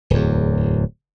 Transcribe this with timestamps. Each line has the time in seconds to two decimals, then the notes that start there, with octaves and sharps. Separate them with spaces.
0.10 D1 E2